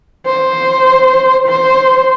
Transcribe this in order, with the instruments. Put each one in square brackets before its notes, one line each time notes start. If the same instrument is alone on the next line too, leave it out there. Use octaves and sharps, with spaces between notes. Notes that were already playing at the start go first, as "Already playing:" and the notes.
[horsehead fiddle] C5
C5